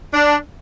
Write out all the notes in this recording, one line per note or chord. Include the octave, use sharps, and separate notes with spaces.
D4